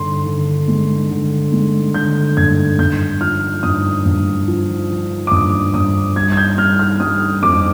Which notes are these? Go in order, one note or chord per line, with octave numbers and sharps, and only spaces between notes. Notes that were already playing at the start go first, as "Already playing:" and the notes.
Already playing: G2 D3 C6
D3
G#3
D3
G#3
D3 G6
G2 G#6
G2 G6
F3 F6
G2 D#6
G2
F3
F3
D6
G2 D#6
G2 D#6
G3 G#6
G#6
G6
G3 F6
F6
G3 D#6
F2 D6